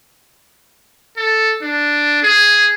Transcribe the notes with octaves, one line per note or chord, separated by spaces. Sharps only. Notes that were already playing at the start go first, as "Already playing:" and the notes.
A4
D4
G#4